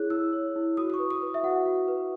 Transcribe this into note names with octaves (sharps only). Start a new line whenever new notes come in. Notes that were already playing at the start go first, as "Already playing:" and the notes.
Already playing: E4 G#4 C#5 F#6
E4 E6
C#5
E4
F#4 D#6
D#6
C#6
B4
D#6
B4
E5
F#4 F#5
F#4
B4